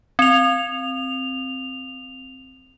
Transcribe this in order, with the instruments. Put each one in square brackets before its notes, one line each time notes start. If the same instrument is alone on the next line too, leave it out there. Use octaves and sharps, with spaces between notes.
[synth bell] C4 F7